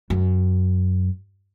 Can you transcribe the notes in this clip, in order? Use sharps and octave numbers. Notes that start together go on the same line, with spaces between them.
F#2